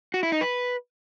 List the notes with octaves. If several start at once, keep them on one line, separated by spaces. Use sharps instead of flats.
F#4
E4
D#4
B4